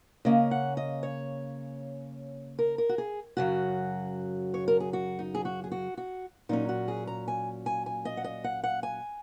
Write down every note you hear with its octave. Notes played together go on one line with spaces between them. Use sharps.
C#3 A#3 C#4 D#5
F#5
D#5
C#5
A#4
A#4
F#4
G#4
F#2 C#3 F#3 F#4
C#5
A#4
G#4
F#4
D#4
G#4
F#4
G#4
F#4
F#4
A#2 F#3 C#4 D#4
F#4
G#4
A#5
G#5
G#5
G#5
D#5
F#5
D#5
F#5
F#5
G#5